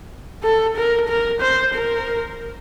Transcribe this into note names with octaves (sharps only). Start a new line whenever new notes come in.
A4
A#4
A#4
C5
A#4